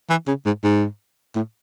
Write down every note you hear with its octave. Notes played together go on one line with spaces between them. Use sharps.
E3
C#3
G#2
G#2
A2